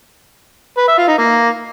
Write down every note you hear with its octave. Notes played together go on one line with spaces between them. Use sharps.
B4
E5
F4
D#4
A#3